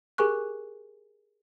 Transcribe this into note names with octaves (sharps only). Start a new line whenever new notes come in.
G4 G#4 A#4 G#5 C#6 F#6